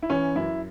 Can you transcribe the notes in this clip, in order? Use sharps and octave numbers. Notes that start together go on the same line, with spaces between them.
E4
E3 C#4
F#2 E4